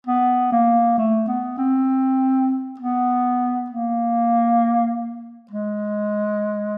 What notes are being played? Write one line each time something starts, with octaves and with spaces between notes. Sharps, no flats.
B3
A#3
A3
B3
C4
B3
A#3
G#3